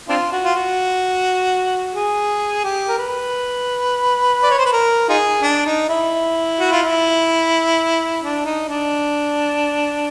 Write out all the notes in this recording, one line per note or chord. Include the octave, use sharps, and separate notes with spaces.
C4 D4 F4
F#4
F4
F#4
G#4
G4
A#4
B4
D5
C#5
C5
B4
A#4
D#4 F4 G#4
D4
D#4
E4
F#4
F4
E4
D4
D#4
D4